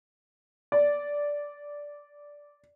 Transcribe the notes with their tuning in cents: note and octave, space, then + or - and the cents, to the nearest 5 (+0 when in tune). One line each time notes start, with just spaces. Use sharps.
D5 -10